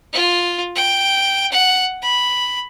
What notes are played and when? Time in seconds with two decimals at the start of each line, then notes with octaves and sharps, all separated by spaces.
0.13 F4
0.76 G5
1.52 F#5
2.02 B5